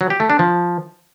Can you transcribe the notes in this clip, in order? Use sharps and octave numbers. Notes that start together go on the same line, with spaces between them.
F#3
G4
A3
D4
F3